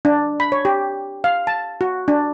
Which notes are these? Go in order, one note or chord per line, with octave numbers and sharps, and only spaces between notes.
D4
B5
C#5
G4
F5
A5
F#4
D4